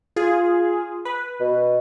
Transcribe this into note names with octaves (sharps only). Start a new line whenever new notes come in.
F4 G#4
B4
B2